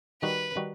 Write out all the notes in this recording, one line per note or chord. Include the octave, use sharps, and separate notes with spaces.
D#3 G3 D#4 F#4 B4
D#3 G3 D#4 F#4